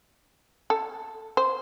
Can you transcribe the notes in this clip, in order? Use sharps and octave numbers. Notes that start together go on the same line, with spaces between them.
A4
C5